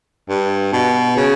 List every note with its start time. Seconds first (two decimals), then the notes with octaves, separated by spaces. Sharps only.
0.29 G2
0.73 B2
1.16 C#3